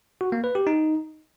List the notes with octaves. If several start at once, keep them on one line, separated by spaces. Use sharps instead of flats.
F#4
A#3
B4
G4
D#4